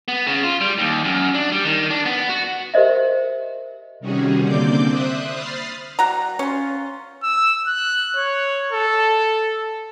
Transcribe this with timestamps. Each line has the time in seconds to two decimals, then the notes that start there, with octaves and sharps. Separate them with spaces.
0.08 B3
0.27 C#3
0.44 F4
0.61 G3
0.79 D#2
1.05 F#2
1.35 D4
1.52 G3
1.65 D#3
1.91 D4
2.06 B3
2.29 F#4
2.74 G4 A#4 C5 D#5 E5
4.00 C3 D#3 G3 C#4 F#4 G#4
4.41 D3 A#3 C4 D5 D6 G6
4.88 C5 E5 D#6 F#6
5.30 B5 D#6 F6 A6 C7
5.99 G3 F#4 A#5
6.39 C#4 F4
7.23 E6
7.68 F#6
8.16 C#5
8.72 A4